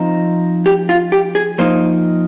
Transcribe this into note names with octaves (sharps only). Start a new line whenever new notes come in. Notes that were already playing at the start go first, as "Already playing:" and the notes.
Already playing: F3 C4 D#4
G4
F4
G4
G#4
F3 A#3 D#4 C5